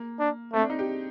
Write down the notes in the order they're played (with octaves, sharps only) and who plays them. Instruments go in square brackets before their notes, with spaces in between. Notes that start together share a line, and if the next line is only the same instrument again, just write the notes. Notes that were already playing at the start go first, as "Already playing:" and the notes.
Already playing: [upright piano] A#3
[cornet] D4
[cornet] A3 [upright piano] C4
[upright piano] D4
D#4
G4